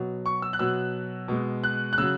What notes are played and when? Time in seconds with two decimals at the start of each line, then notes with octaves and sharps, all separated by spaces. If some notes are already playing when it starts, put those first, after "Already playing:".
Already playing: B2 F#3
0.26 C#6
0.42 E6
0.53 F#6
0.59 B2 F#3 E6
1.28 B2 G#3
1.64 F#6
1.93 F#6
1.98 C#3 F#3 E6